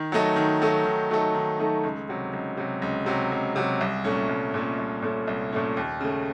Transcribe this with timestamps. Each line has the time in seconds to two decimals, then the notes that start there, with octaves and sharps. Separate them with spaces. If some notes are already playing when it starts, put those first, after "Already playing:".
Already playing: D#3
0.12 F#3 A3 D#4 A4
0.36 D#3
0.62 F#3 A3 D#4 A4
0.85 D#3
1.11 F#3 A3 D#4 A4
1.35 D#3
1.59 F#3 A3 D#4 A4
1.83 C#2
2.09 C3 F#3
2.33 C#2
2.57 C3 F#3
2.82 C#2
3.06 C3 F#3
3.32 C#2
3.56 C3 F#3
3.81 C2
4.04 A#2 A3 C#4
4.29 C2
4.54 A#2 A3 C#4
4.78 C2
5.02 A#2 A3 C#4
5.27 C2
5.52 A#2 A3 C#4
5.77 D#2
6.01 C#3 A3